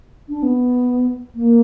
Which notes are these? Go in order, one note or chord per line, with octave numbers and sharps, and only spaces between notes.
D4
B3
A#3